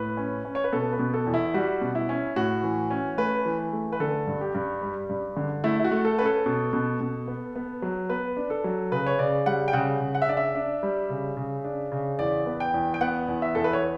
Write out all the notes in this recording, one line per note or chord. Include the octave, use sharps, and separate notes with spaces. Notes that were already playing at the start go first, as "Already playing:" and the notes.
Already playing: A2 B4
C#4
C#4
C#5
B4
B2 A4
B4
B2
A4
E2
E4
G3 F#4
B2
E4
C#4
A2 F#4
E3
C#4
A3 B4
E3
A3
B4
D3 A4
G2
G4
G2
G3
G2
D3
A3 E4
E4
F#4
A3
A4
C#4 B4
A4
B2
B2
B2
B3
B3
F#3
B3 B4
D4
A4
F#3
C#3 B4
C#5
C#3 D5
G3 F#5
G5
C#3 F#5
C#3
F#5
E5
D4 D5
E5
D4
G3
C#3
C#3
D4
C#3
E2 D5
B3
G5
E2
G5
B3 F#5
E2
E5
E2 A4
B4
C#5